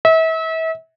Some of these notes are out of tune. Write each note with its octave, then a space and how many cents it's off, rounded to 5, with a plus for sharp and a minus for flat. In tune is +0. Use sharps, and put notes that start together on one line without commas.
E5 -35